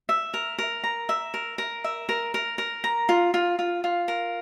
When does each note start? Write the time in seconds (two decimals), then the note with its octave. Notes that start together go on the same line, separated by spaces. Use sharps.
0.09 E5
0.34 A#4
0.58 A#4
0.84 A#5
1.09 E5
1.34 A#4
1.58 A#4
1.84 E5
2.09 A#4
2.34 A#4
2.58 A#4
2.84 A#5
3.09 F4
3.34 F4
3.59 F4
3.84 F4
4.08 A#4